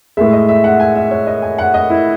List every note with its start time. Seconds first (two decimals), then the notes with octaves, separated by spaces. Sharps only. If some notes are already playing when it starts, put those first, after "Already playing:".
0.17 A2 G#3 E5
0.33 D#5
0.49 E5
0.64 F#5
0.80 G#5
0.95 E5
1.11 C#5
1.27 D#5
1.42 G#5
1.58 F#5
1.74 D#5
1.90 E4